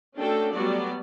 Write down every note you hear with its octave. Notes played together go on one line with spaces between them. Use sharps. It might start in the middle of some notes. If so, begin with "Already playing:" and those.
A3 C#4 D4 F#4 A4 G5
F#3 G3 A3 B3 F#4 D5